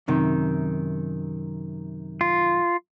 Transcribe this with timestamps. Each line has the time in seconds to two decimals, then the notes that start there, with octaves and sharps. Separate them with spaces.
0.08 F#2 C3 D#3
2.21 F4